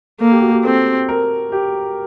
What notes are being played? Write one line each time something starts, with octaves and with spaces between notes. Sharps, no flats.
A#3 A4
G4
F#4
G4
C4 A4
A#4
G4